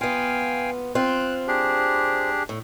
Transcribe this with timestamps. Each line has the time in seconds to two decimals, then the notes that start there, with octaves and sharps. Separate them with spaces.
0.01 B3 F4 F5 G5 G#5
0.95 C4 F4 F#6
1.48 D4 G4 G#4
2.49 A2